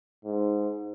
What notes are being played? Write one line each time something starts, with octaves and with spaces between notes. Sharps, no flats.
G#2